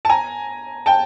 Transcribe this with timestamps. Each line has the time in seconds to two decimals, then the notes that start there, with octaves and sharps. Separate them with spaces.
0.05 A5
0.09 G#5 A#5
0.86 G5 A5